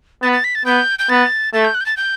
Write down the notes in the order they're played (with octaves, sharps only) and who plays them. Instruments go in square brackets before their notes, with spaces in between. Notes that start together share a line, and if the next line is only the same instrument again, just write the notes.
[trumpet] B3 [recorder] A6
[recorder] A6
B6
A6
[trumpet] B3 [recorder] G6
[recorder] G6
[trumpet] B3 [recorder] A6
[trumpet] A3 [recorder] A6
[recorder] G6
F#6
G6
A6
G6